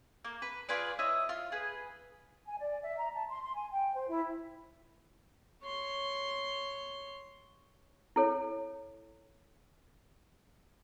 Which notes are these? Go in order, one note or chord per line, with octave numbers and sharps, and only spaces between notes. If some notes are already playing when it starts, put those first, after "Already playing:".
A#3
B4
F4 G#4 B4 D5
E4 C#5 D#5
F4
G#4 B4
G#5
D5
E5
A#5
A5
C6
C6
G#5
G5
C5
E4
C#5 C6
E4 A4 C#5